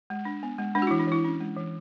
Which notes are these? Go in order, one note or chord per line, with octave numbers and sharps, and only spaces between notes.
G#3
D4
B3
G#3
G#3 D4
F#4
E4
E3
D4
E3 E4
C#4
G#3
E3